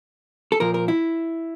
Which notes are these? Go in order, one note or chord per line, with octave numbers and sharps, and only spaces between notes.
A4
A#2 F3 A#4
A#4
E4